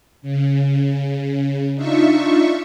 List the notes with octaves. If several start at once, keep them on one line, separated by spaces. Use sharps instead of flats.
C#3
D4 D#4 F4 E5 C#6